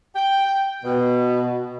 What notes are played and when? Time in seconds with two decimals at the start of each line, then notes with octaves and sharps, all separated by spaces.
0.15 G5
0.84 B2